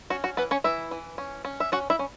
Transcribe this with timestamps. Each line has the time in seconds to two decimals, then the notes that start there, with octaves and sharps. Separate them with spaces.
0.10 C#4 F#4
0.24 F#4
0.37 E3 B3 B4
0.51 C#4 C#5
0.64 E3 E4 E5
0.91 E3
1.18 C#4
1.45 C#4
1.60 E5
1.72 C#4 F#4 F#5
1.90 E4 E5
1.99 C#4